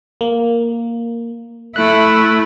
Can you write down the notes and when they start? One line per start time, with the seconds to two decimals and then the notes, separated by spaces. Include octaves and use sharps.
0.21 A#3
1.76 A3 E4 F#6